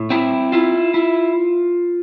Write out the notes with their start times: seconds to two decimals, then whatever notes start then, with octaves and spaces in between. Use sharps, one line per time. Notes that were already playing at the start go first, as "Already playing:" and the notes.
Already playing: A2
0.10 C4 E4
0.52 E4 F4
0.94 E4